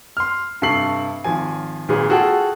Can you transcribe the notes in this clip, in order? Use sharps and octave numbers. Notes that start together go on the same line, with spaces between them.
C6 F6
G2 C3 A4 C#6 C7 F#7
G#1 F3 G#5
G#1 A#2 F#3 G#4 B4
F4 F#4 G#4 A4 G5